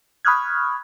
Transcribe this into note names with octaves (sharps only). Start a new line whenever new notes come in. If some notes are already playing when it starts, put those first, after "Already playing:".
B5 C#6 D#6 F6 F#6 G#6